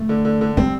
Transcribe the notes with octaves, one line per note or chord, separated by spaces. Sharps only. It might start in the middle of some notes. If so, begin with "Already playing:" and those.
Already playing: A3
D3
D3
D3
G3 C4